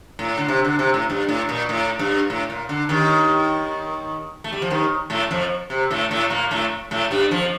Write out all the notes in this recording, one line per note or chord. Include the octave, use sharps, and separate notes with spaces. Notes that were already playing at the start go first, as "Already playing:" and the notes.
A2
D3
C3
D3
C3
A2
G2
A2
A#2
A2
G2
A2
A#2
D3
D#2 D#3
A3
G3
F3
D#2 D#3
A2 A3
F2 F3
C3
A2 A3
A2 A3
A#2 A#3
A2 A3
A2 A3
G2 G3
F2 F3